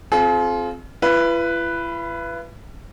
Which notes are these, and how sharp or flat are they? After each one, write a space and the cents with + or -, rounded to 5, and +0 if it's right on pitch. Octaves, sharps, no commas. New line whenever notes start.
C4 +0 F4 +0 G#4 +45
E4 +45 B4 +0